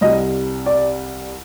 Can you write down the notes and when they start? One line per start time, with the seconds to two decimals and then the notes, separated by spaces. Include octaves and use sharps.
0.01 C2 C3 G3 D#5
0.66 D5